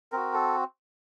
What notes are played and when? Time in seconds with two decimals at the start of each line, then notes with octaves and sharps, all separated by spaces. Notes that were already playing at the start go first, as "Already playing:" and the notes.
0.12 C4 F#4 A#4
0.33 A4